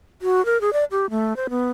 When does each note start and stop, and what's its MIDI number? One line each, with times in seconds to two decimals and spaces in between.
0.22 0.44 66
0.45 0.60 70
0.61 0.73 68
0.73 0.84 74
0.91 1.10 67
1.10 1.36 57
1.36 1.47 72
1.50 1.71 59